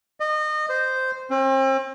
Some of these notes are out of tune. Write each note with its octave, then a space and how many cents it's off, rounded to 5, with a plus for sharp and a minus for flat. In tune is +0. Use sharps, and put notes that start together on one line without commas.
D#5 -30
C5 -10
C4 +40